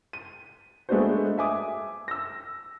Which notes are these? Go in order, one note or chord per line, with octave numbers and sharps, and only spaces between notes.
D#7
G#3 A3 B3 D4 F#4 C5
E5 G#5 D6 D#6
E6 A#6